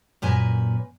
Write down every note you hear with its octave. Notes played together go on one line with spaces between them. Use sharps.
F#2 A#2 B4 G#5